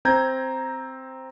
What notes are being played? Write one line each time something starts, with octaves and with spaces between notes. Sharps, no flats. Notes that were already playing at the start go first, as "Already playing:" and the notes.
C4 A#5 G6 G#6